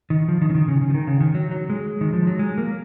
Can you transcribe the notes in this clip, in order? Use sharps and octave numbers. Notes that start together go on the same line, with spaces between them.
D#3
F3
D#3
C#3
D#3
C#3
C#3
F3
D#3
C#3
D#3
F#3
F#3
G#3
D#3
F3
F#3
G#3
A#3